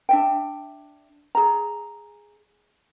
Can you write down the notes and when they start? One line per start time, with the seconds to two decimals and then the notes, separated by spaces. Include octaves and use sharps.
0.09 D4 E5 G5
1.35 G#4 A#5